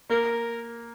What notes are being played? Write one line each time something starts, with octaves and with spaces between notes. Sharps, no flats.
A#3 A#4